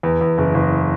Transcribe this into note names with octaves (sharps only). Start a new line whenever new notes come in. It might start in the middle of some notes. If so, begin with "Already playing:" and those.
E2
E2
F#1
F#1